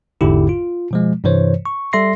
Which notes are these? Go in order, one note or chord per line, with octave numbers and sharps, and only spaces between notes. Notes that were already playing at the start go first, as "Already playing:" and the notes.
G#1 E2 G#2 D3 E4 G4
F4
B2 F3 G#3
G2 C3 E3 C5 C#5
C#6
G3 A4 E5 C6 A#6 C7